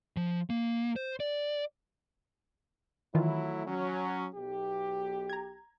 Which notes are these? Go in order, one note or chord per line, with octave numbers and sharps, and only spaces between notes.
F3
A#3
C5
D5
D#3 E3 F#3 A3 E4 F4
F#3 C#4
B1 G4
A#5 G#6